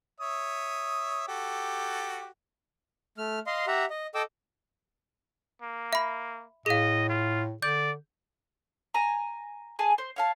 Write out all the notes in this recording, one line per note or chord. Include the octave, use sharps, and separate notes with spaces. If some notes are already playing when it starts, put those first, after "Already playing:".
C#5 E5 D#6
F#4 G4 A4
A3 F6
D#5 F5 C6
G4 E5 F#5 A#5
D#5
A4 D#5 G5 D6 E6
A#3
E5 B5
A2 G#4 D#5 F5
F4
D3 D5 G6
G#5 A#5
G#4 G#5 A5
C5
C#5 F5 A5